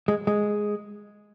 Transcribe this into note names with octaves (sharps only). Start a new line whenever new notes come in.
G#3
G#3